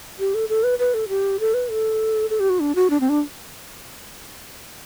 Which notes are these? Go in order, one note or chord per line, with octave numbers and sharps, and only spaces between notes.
G4
A4
A4
B4
B4
A4
G4
A4
B4
A4
A4
G4
F#4
D4
F#4
D4
C4
D4